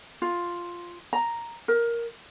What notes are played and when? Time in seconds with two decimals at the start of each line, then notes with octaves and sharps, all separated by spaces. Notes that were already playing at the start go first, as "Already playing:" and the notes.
0.22 F4
1.13 A#5
1.68 A#4